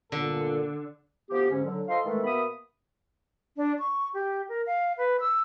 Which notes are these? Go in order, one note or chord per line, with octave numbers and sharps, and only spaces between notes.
G1 A#2 D3 A4
D2 F3 B3 G4
G#2 D3 C#4
D3 F#3
F4 A4 C5 D#5 F5 C6
D#3 E3 G#3 A3 A4
B2 A#3 B3 E5 B5 D#6
D4
C#6
G4
A#4
F5
B4
E6